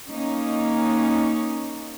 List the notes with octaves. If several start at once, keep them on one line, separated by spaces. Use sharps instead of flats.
A#3 C#4 D#4